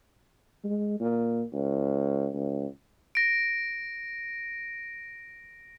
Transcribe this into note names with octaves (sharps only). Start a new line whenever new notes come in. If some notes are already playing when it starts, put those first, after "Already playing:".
G#3
A#2
C#2
C#2
A#6 D7